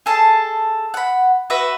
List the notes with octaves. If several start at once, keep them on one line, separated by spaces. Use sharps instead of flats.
G#4 A4 A5
F#5 B5
F#4 B4 E5